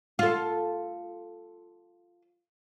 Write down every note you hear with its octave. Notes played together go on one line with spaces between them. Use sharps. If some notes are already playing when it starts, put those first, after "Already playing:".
F4 A4